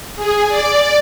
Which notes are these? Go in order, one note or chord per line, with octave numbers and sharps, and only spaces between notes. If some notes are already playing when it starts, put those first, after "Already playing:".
G#4
D5